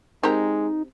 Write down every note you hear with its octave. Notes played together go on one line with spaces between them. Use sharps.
G#3 C4 D#4 G4 A#4